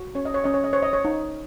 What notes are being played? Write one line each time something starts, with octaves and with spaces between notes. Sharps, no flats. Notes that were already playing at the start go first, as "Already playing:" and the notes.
Already playing: F#4
C#4 C#5
D#5
C#5
C#4 D#5
C#5
D#5
C5 C#5
D#5
C#5
D#4